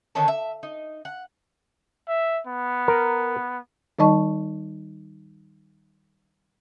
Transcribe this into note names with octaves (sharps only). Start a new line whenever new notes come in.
D3 D#3 C#4 A5
E5
D#4
F#5
E5
B3
A#4
D#3 G3 D#4 D#5 A5 C#6